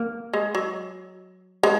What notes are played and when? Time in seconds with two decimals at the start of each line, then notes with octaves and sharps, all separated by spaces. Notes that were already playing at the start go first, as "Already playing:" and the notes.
Already playing: A#3
0.33 G#3
0.55 F#3
1.63 G#3